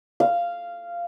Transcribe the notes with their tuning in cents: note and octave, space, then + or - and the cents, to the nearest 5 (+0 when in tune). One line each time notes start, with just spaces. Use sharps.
F5 -10